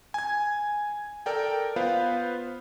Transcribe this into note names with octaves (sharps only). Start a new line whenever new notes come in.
G#5 G#6
A4 A#4 D5 G5
B3 F4 B4 C5 F5